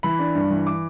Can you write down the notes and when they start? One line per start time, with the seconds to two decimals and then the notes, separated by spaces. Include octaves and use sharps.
0.03 E3 B5
0.19 D4
0.35 G2
0.50 E3
0.67 D6